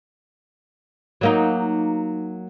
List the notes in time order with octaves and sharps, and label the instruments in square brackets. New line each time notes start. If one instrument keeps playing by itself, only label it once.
[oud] F#3 A#3 D#4